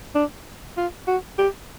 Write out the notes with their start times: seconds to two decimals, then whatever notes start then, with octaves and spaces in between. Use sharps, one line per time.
0.15 D4
0.77 F4
1.07 F#4
1.38 G4